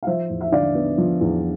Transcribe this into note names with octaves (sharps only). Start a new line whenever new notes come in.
F5
F3 C5 E5
E2
E5
D3 D5 F5
B3
F3
E2